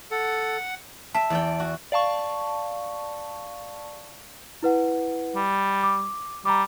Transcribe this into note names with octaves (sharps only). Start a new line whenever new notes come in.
A4 F#5
E5 A5
E2 D5 G5
F#4
D5 F5 A5 C#6
E4 B4 F#5
G3
D6
G3 A#5 D6